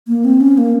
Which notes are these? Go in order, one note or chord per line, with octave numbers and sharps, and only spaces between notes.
A#3
C4
C#4
A#3